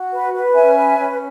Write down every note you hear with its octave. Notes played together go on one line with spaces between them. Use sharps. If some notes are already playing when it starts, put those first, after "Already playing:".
Already playing: F#4
B4
B4
C#4 E5 G#5
B4
C#4